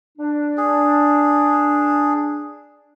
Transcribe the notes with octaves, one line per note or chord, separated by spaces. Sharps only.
D4
G#4